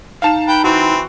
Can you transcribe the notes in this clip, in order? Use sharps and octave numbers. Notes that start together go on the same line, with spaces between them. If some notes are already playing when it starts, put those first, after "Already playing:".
D#4 F5 A5 E7
B4 G5
E3 C4 F#4